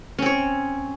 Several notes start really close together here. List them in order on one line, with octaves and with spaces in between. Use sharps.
C#4 C4 C#5